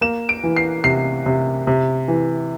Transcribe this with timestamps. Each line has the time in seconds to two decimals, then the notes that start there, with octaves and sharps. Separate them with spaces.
0.01 A#3 E7
0.29 D7
0.43 E3
0.56 C7
0.84 C3 C7
1.26 C3
1.67 C3
2.08 E3